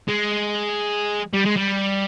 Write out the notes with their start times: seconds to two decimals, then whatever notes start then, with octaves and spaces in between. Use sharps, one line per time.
0.09 G#3
1.33 G3
1.45 G#3
1.57 G3